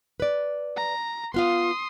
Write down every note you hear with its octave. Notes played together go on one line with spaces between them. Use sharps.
B4 D5
A#5
B3 F4 F5 C6 D#6